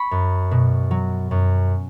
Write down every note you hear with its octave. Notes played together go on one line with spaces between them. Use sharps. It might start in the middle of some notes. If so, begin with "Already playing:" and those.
Already playing: B5 C#6
F#2
B2
F#3
F#2